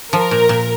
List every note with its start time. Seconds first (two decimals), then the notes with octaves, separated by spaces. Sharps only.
0.13 F3 A#4
0.31 A#2
0.49 A#2